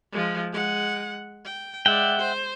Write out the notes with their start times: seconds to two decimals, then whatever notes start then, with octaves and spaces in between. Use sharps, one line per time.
0.12 F3 G#3
0.52 G#3 F#5
1.46 G5
1.86 G#3 D5 E5 F#5 G5
2.19 C5